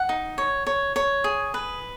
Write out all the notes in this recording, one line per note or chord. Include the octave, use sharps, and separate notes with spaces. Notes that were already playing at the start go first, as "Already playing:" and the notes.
Already playing: F#5
D#4
C#5
C#5
C#5
G#4
B4